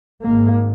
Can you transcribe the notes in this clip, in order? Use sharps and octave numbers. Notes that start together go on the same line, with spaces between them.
G#1 G#2 A#3